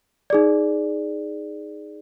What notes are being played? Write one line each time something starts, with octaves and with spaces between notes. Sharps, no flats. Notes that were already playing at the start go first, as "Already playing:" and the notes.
D#4 G#4 D5